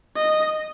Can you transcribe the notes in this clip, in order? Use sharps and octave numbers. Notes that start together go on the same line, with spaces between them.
D#5